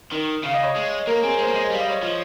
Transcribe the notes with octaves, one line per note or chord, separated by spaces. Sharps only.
D#3
C#3 F5
D#5
C#5
G#3 D#5
A#3 A#4
C4 G#4
G#3 C5
A#3
G#3 D#5
G3 F5
D#5
C#5
F3 D#5